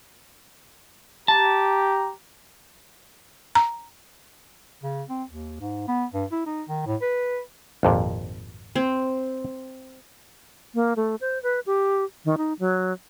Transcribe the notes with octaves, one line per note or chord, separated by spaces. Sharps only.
G4 A5 A#5
A#5
C#3
C4
D#2
G#2
B3
G2
E4
D#4
D#3
A2
B4
G#1 F2 A#2
C4
A#3
A3
C5
B4
G4
D#3
D#4
F#3